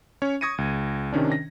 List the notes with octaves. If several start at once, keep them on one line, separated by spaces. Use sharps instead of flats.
C#4 C#5
C#6 D#6 G#6 A#6 C#7 D#7
C#2
C3 D#3 C#4 D4
A#6